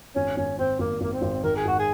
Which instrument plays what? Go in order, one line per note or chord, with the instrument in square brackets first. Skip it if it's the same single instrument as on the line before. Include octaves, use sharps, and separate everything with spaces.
[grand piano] G#1 [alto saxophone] C#4
[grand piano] G#1 [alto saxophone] C#4
[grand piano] G#1 [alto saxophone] C4
[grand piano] G#1 [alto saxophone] A#3
[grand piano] G#1 [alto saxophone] A#3
[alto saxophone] C4
[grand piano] G#1
[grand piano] D#3 [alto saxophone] A#4
[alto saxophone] G#4
[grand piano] G#2 [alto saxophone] F#4
[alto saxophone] G#4